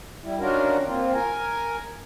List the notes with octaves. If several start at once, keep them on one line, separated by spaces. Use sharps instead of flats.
G3 E4
D#3 C#4 D4 F4 F#4 A#4
A#3 C4 F4
A#4 G#5